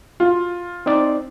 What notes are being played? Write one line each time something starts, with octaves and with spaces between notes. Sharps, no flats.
F4
C4 D#4 D5